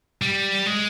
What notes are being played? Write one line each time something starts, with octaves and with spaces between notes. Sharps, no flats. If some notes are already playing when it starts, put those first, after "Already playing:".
G3
G#3